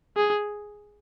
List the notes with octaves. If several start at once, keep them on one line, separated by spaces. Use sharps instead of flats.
G#4